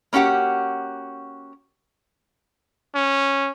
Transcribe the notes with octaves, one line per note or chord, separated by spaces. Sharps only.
A#3 C#4 F#4 G4 F#5
C#4